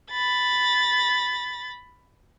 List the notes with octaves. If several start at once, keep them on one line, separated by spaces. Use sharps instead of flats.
B5 A6